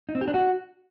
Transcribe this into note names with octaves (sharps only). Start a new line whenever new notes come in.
D#4
C4
G4
D4
F#4